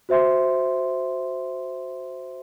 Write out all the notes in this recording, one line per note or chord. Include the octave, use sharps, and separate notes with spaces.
F#4 C5 E5 C6